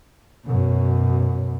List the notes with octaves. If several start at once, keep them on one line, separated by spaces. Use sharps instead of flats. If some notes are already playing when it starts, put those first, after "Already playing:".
F#2 B2